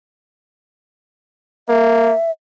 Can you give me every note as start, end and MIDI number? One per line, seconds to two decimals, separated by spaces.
1.69 2.13 58
1.69 2.31 76